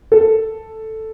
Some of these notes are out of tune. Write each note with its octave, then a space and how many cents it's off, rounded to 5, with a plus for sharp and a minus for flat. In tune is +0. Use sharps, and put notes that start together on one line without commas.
A4 +0